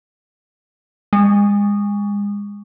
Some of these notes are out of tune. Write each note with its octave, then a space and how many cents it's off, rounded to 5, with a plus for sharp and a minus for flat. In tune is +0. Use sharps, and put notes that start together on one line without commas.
G#3 -30